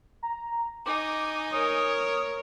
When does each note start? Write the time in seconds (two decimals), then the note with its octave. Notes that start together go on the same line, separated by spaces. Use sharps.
0.23 A#5
0.86 D#4 G#5 D6
1.52 A#4 C#5 D#6